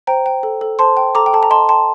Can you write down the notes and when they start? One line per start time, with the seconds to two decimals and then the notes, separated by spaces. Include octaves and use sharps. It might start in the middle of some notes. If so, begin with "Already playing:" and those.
0.07 C5 G5 A#5
0.26 G5
0.43 A4
0.61 A4
0.79 C5 A5 C6
0.97 G5
1.15 A4 A#5 D6
1.26 G5
1.33 A4 A5
1.43 A#5
1.50 D#5 A5 C6
1.69 G5 A5 C6